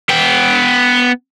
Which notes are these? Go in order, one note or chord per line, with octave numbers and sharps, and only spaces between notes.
B3 G5